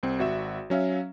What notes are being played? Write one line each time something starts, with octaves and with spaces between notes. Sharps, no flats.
C2 C4
G#1 F#4 E5 E7
F#3 C#4 E5 F5